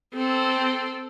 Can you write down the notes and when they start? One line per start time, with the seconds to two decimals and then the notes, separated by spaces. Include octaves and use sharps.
0.15 C4 A4